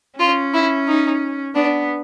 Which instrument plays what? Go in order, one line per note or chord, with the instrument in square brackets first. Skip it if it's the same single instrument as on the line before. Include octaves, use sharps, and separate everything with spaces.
[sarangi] C#4 [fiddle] F4
[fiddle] E4
D#4
[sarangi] B3 [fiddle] D4